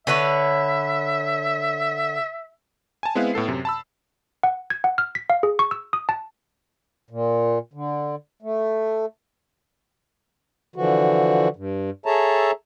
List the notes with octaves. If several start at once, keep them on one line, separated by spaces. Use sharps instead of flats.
D3 B4 C#5 E5
G#5 A5
G#3 B3 C4 E4 B4 F5
A2 B3 A4 C7
F#2 C3
A5 B5 E6
F#5
G#6
F#5
F6
B6
F5
G#4
C#6
E6
D#6
A5
A#2
D3
A3
D3 E3 F3 F#4
G2
G#4 A4 C#5 E5 A5 A#5